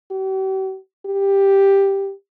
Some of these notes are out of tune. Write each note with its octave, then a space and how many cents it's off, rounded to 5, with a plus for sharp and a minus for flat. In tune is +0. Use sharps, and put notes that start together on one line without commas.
G4 -45
G4 +5